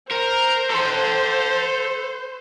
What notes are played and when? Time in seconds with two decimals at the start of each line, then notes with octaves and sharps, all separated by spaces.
0.12 A#4 C5
0.71 A4 C6